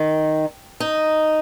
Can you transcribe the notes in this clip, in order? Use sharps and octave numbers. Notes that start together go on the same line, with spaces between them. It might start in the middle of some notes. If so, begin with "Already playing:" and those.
Already playing: D#3
D#4